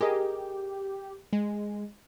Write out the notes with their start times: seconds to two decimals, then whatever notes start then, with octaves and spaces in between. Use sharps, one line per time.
0.01 G4 G#4 A#4 D#5
1.33 G#3